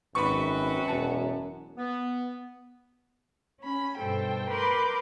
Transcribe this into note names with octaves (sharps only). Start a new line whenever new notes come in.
G#1 F#2 C4 F#4 B4 B5 C#6
E1 A5
B3
C#4 B5
G2 B2 A4 C5 G5
A#4 B4 B5 C6 D6 G6